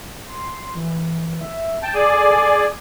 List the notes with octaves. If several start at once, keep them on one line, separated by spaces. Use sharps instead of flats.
C6
E3
E5
G5 A5
G#4 A4 D5 G#5